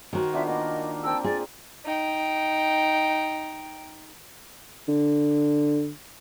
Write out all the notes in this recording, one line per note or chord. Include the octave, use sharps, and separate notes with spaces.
D#3 F#4 A#4 C5 G#5
B3 D4 F4 E5
A#3 D#5
C4 A#4 G5 A5 E6
F4 G#4 D5
D#4 G5
D3